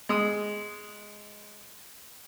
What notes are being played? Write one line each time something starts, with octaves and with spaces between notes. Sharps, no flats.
G#3 D#6